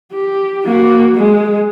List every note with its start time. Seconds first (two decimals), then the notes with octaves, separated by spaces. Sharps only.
0.13 G4
0.66 A#3 F#4
1.16 G#3